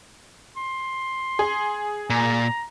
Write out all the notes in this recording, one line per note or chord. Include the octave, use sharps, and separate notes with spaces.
C6
G#4
A#2 A#5